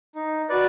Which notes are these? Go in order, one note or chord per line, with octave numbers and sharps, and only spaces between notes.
D#4
F#4 B4 D5